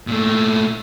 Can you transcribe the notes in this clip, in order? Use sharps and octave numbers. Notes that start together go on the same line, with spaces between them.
A#2 A3